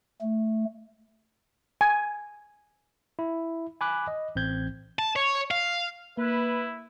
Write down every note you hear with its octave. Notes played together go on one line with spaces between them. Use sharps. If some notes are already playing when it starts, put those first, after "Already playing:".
A3
G#5
E4
G#5 B5 D6 F#6
D#5
A1 C4 G6 G#6
A5
C#5
F5
A#3 E4 B4